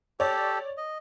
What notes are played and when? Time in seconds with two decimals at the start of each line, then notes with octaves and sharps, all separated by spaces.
0.20 G4 A4 C#5 D5
0.78 D#5